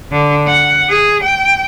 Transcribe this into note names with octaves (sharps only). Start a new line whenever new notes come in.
D3
F#5
G#4
G5